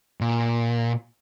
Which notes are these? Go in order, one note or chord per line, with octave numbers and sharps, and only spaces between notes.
A#2